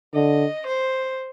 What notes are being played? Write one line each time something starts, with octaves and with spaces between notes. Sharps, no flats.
D3 D#5
C5